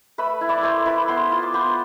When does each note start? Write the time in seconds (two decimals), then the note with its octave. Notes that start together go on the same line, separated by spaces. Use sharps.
0.18 A3 B4 B5
0.41 E4
0.49 D5 D6
0.63 A3 C5 C6
0.86 E4 B4 B5
1.08 B3 C5 C6
1.31 F4
1.43 D6
1.54 B3 C5 C6